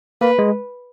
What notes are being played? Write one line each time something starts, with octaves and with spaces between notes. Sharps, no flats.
A#3 B4
G#3